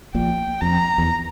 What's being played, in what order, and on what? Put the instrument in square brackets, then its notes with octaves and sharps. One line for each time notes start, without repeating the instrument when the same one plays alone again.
[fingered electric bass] A#1 A#2 [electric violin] G5
[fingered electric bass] F2 [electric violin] A#5
[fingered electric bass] E2